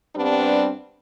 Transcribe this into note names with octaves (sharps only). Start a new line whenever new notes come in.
G2 G3 B3 C4 D4